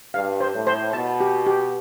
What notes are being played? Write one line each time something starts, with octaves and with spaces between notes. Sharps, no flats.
G2 F5
C5
A2
C5
B2 A5
G4
G4